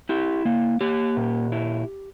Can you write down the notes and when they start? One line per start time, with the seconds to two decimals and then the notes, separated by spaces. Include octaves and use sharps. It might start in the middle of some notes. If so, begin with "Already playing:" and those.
0.09 E4 G4
0.45 A#3
0.81 A#3 G4
1.17 A#2
1.52 E4